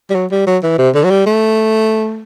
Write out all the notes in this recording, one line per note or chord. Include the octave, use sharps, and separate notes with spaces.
G3
F#3
G3
F#3
E3
C3
D3
F#3
G3
A3